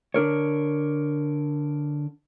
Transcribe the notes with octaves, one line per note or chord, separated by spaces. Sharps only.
D3 D4 A#4 C#5